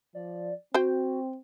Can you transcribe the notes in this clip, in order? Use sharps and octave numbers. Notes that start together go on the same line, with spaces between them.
F3 D5
C4 F#4 C5 G5